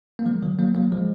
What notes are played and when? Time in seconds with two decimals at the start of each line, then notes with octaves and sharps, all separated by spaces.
0.19 A#3
0.26 F3 G#3
0.43 D#3 F#3
0.59 F#3 A#3
0.75 F#3 A#3
0.92 F3 G#3